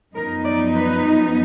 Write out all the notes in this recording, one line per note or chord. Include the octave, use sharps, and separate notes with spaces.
F#2 F3 B3 D#4 A#4
D5
B4